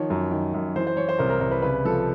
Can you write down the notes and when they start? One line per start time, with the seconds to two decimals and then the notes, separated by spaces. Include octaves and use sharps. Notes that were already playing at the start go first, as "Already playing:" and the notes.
Already playing: D#3 F3 C#5
0.10 F#2
0.31 D#3
0.54 F#2
0.76 E3 C5
0.87 C5
0.97 E3 C#5
1.09 C5
1.18 C2 A#4
1.30 A#4
1.40 C2 A#4
1.51 B4
1.62 C#3 B4
1.85 F3 A4